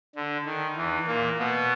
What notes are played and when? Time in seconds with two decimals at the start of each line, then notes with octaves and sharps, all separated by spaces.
0.15 D3
0.45 D#3
0.76 E2 E3
1.07 A#2 A#3
1.38 B2 B3